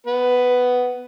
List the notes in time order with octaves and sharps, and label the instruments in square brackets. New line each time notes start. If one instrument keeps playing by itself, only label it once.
[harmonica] B3 B4